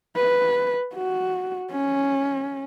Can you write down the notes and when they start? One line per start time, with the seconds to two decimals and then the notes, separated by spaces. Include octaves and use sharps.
0.16 B4
0.95 F#4
1.72 C#4